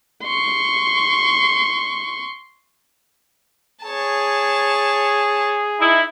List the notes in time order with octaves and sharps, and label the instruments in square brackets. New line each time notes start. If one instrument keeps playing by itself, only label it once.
[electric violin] C6 C#6
[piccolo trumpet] G#4 [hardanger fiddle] C#5 A5
[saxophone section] D#4 E4